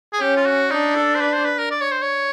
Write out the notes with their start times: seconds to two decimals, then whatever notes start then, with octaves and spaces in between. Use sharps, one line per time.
0.13 G#4
0.20 C#4 G4
0.37 F4
0.46 F#4
0.71 D4 D#4
0.95 A4
1.15 C5
1.21 B4
1.33 C5
1.46 B4
1.58 A#4
1.71 D5
1.81 C#5
1.91 C5
2.02 C#5